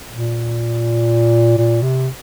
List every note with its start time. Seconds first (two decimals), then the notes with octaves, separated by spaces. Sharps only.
0.11 A#2
1.57 A#2
1.82 C3